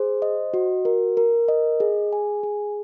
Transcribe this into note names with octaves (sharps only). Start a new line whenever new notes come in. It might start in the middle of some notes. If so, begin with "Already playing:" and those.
Already playing: G#4 C5
D#5
F#4
A#4
A#4
D#5
G#4
G#5
G#4